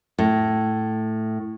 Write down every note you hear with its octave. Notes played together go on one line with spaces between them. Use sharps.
A2